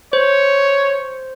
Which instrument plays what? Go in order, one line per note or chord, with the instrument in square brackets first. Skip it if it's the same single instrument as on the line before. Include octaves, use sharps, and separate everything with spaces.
[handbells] C5 [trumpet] C#5